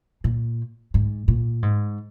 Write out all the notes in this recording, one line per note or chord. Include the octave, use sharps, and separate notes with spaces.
A#2
G#2
A#2
G#2